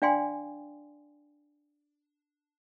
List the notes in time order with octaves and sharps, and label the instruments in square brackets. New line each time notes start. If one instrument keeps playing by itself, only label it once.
[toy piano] D4 D5 F5 G5 G#5 C6